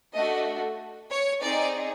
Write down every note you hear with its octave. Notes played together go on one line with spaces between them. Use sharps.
A3 D4 F#4 A4 D#5
C#5
C4 D#4 G#4 D5